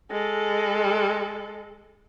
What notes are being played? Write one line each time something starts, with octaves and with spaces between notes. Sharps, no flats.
G#3 A4